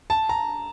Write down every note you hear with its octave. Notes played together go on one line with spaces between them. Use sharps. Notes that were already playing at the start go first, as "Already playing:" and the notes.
A5
A#5